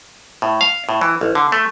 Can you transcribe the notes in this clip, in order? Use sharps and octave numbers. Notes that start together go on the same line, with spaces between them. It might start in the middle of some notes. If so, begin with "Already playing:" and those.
A2
F5
A2
E3
A1
D3
A3